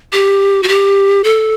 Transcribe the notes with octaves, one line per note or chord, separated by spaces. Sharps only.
G4
F#4
G4
A4